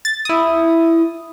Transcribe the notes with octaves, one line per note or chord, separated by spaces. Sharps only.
A6
E4 D#6